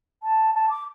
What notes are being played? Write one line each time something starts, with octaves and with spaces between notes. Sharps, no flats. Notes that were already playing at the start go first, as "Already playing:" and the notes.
A5
A5
D6